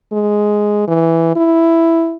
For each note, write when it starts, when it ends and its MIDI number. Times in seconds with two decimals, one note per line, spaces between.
0.13 0.87 56
0.87 1.34 52
1.36 2.17 64